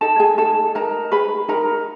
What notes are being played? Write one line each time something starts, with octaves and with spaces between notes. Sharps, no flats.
D#4 A4 A5
G#4 G#5
D#4 A4 A5
D#4 A#4 A#5
G#4 B4 B5
D#4 A#4 A#5